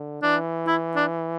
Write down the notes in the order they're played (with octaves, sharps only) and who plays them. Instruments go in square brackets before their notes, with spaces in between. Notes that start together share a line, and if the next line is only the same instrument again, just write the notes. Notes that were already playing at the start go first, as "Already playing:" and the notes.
Already playing: [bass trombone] D3
[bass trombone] E3 [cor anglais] D4
[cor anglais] E4
D4